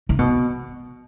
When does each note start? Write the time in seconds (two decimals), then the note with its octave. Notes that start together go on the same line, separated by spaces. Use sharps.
0.09 C#3
0.19 B2